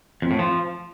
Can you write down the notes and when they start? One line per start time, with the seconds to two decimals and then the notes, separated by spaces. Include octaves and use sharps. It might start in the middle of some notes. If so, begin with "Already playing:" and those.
0.22 F2
0.31 A2
0.39 F3